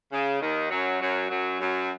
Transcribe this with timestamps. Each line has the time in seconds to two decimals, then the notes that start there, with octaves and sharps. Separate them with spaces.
0.12 C#3
0.41 D#2 D#3
0.70 F#2 F#3
1.00 F#2 F#3
1.30 F#2 F#3
1.59 F#2 F#3